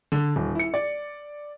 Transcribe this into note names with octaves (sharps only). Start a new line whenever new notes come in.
D3
D#1
E4 C#7
D5